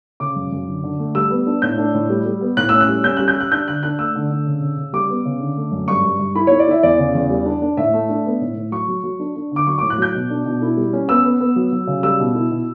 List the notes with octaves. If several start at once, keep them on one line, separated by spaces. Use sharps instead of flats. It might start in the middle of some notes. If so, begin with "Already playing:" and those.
C#3 D6
F#2
F#2
D3
D3
A3
G3 E6
B3
D4
A2 G6
D4
A2
G3
G3
B3
A2 F#6
C#4 E6
F#6
G3
C#4 G6
G3 F#6
G6
G3
F#6
D4 G6
D3 F#6
D4 F#6
A3 E6
D3
D3
C#3
C#3
C#3
G3 D6
B3
C#3
D3
A3
F#2
G2 C#6
G2
G2
E4 B5
E4 C#5
D5
E4 E5
E2 D5
C#3
E2
G3
D4
D4
A2 E5
A3
D4
B3
A2
A2
F#3 C#6
F#3
F#3
D4
D4
D3 D6
F#3 C#6
A2 D6
F#6
F#3 G6
B2
D4
B2
E4
G3
C#4
B3 E6
B3
B3
F#3
F#3
C#3
G3 E6
B2
E4
B2